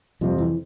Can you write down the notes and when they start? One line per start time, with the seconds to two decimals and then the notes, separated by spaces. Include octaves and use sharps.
0.21 F2 C3 F3 G3 C4 F4
0.38 E3